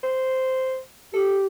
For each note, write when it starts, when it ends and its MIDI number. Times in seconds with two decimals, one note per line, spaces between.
0.03 0.78 72
1.14 1.47 67
1.14 1.38 69